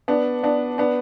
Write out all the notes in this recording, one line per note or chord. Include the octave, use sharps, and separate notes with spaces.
B3 D4
B3 D4
B3 D4